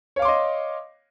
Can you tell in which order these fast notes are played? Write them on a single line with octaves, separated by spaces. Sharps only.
C#5 F5 D6 C6 D#5